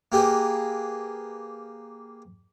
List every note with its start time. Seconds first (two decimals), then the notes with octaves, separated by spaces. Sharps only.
0.12 A#3 G4 G#4 B4